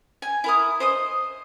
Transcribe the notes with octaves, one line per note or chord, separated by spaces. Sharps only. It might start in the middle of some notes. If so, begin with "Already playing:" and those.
G#5
E4 A#4 D#6
C5 D#5 D#6